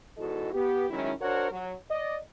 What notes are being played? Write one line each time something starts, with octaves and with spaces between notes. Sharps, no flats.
E2 G#2 E4 F#4 A4 D#5
B3 G4
D#3 F#3 G#3 C#4 E4
D4 F#4 A#4 C5 C#5 F#5
F#3
D5 D#5